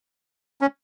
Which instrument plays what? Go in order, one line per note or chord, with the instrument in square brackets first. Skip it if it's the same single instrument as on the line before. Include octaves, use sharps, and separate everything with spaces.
[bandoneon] C#4